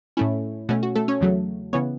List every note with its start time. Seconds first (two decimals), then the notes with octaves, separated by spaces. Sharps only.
0.17 A2 A3 C#4 E4
0.69 B2 A3 C#4 F#4
0.83 F#4
0.95 A3 A4
1.08 C#4 C#5
1.21 E2 C#3 F#3 A3
1.73 C#3 E3 B3 C#4 C#5